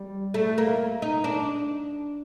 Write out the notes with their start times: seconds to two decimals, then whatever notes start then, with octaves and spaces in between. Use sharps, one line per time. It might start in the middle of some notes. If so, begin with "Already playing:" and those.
Already playing: G3
0.34 A3
0.58 A#3
1.02 D#4
1.24 D4